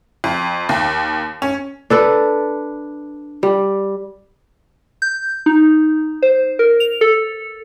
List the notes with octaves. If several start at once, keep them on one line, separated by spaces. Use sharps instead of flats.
F2
D#2
C#4
D4 A4 B4
G3
G6
D#4
C5
A#4
F7
A4